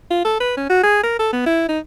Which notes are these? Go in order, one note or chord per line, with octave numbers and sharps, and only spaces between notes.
F4
A4
B4
C#4
F#4
G#4
A#4
A4
B3
E4
D#4